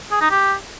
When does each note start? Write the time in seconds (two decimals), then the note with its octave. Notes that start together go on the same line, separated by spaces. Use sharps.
0.11 G#4
0.21 D#4
0.31 G4